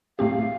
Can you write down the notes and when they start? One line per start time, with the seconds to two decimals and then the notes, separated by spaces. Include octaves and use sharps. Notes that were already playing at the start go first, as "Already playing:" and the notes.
0.19 A2 A3 C4 G4 F5
0.35 F5